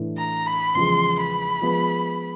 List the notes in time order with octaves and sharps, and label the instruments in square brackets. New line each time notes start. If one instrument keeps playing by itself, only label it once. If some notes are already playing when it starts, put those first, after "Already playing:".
Already playing: [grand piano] A2 E3 A3 D4
[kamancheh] A#5
B5
[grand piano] E2 C#3 F3 G#3 [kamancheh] C6
[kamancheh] B5
[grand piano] F3 G#3 B3